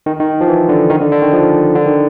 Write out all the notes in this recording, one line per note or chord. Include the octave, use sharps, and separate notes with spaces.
D#3
D#3
F3
E3
D3
D#3
D3
D3
D#3
F3
D3
D#3